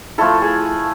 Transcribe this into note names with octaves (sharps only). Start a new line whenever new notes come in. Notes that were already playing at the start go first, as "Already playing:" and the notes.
F3 A3 E4 A4
G#4